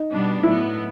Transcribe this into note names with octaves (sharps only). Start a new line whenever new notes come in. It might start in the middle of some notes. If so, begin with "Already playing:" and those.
Already playing: D#4
B2 G3 B3 D4
A2 F#3 B3 E4